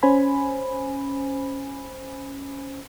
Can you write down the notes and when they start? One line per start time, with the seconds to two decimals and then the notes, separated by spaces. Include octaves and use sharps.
0.03 C#4 C5 G#5 B5